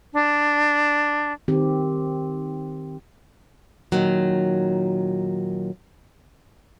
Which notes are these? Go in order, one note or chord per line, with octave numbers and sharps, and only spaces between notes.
D4
D#3 C4 G4
A#2 D#3 F#3